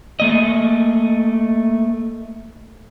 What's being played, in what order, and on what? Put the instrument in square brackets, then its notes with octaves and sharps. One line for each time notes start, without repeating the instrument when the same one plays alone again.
[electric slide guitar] A3 A#3 D#5